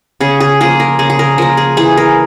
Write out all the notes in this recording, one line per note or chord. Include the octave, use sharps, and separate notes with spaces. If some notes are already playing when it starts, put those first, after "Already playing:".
C#3 G#4
G#4
F3 A#3 G#4
A#4
C#3 G#4
G#4
A#4
F3 A#3 A#4
G#4
E3 G#4
A#4